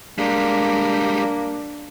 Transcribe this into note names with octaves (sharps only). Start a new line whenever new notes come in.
G3 G#3 A#3 D4